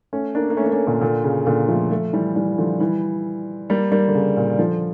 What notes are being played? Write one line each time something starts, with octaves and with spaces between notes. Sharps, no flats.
A3 C#4
A#3 D4
A#3
A3 C#4
A#3
A3 C#4
A#2 D3
A#2 D3
C#3
A#2 D3
F3 A3
F3 A3
E3 G3
E3 G3
D3 F3
E3 G3
G3 A#3
G3 A#3
D3
C#3
A#2 D3
D3 F3